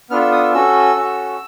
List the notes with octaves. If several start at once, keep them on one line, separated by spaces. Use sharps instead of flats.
B3 D4 F4 A4 F6
E6
D#6
E6
C#4 F#4 A4 E6
C#4 F#4 A4